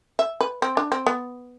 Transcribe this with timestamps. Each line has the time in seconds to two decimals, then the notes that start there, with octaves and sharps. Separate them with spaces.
0.19 E5
0.41 B4
0.62 C4
0.77 D4
0.92 C4
1.06 B3